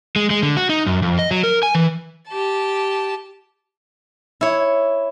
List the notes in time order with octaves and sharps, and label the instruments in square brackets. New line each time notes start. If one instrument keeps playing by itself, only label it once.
[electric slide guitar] G#3
G#3
D3
F#4
D#4
F#2
F2
D#5
F#3
A#4
G#5
E3
[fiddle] G4 A5
[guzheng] E4 C#5